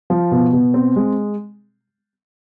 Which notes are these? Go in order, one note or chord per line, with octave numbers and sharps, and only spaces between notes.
F3
B2
B2
C4
G#3